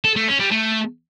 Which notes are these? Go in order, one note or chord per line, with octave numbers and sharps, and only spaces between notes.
A4
A3
C#4
G3
A3